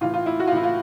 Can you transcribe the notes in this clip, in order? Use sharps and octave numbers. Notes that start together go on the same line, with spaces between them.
A2 E3 F4
F4
E4
F#4
F4
A2 E3 E4
F4